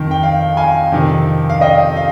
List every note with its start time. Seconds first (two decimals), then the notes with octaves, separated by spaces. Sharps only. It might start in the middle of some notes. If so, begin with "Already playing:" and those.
Already playing: F2 D#3
0.11 G5
0.23 F5
0.57 F5 G#5
0.92 F2 C3 D#3
1.50 F5
1.61 D#5 G5
1.96 F5